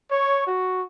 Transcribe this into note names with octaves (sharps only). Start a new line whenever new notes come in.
C#5
F#4